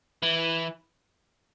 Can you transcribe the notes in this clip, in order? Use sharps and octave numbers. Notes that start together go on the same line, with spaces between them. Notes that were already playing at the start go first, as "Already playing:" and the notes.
E3